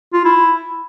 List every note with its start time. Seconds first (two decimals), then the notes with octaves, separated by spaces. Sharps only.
0.13 F4
0.25 E4